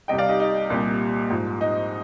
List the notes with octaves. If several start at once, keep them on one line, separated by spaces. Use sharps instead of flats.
C2 C3 G3 D#5 G5
D5 F5
D#4 G4
D#4
C2 A#2 G3
G#2 F3
D#4